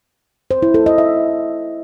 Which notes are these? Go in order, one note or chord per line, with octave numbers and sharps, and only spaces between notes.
C5
E4
A4
D#5
E5